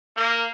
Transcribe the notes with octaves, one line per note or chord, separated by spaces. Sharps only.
A#3